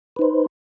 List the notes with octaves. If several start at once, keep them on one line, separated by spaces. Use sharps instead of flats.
D#4 B4 C5